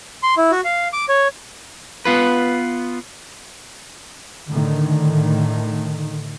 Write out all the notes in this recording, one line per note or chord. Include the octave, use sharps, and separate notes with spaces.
C6
E4
F#4
F5
D6
C#5
B3 F4 B4
A2 D3 D#3